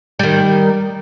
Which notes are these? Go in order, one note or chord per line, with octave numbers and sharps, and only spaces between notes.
D#3 G3